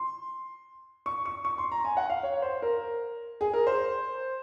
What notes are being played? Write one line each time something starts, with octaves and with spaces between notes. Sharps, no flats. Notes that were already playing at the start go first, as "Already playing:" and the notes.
Already playing: C6
C#6
C#6
C#6
C6
A#5
G#5
F#5
F5
C#5
C5
A#4
G#4
A#4
C5